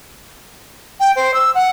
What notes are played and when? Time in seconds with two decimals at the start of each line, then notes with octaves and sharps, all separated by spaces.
1.00 G5
1.16 C5
1.34 E6
1.54 F#5